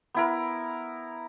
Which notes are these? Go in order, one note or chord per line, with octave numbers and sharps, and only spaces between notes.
B3 E4 A#4